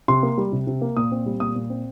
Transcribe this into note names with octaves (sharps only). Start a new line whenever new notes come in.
C3 C6
A#3
G3
C3
C3
A#3
A#2 D#6
C4
G3
A#2 D#6
A#2
C4